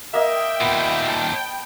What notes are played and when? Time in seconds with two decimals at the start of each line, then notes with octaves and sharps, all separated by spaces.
0.14 A#3 D#5 E5 G5
0.61 D#2 A#2 B3
1.08 A5